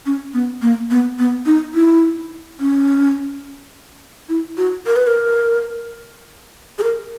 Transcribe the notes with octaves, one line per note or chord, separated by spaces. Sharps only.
C#4
B3
A#3
B3
B3
D#4
E4
C#4
E4
F#4
A#4
B4
A#4
G#4
A#4